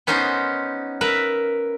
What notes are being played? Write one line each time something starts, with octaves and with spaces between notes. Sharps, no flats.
B3 C#4 D#4 C5
A#4 B4 E5